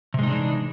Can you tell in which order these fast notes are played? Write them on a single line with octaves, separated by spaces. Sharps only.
C3 G#3 D#4 D4 E3